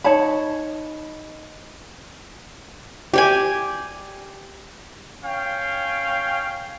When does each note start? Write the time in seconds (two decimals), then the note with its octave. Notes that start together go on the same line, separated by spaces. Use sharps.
0.04 D#4 C#5 A5 B5
3.13 G4 D5 G#5
5.24 C#4 F5 G5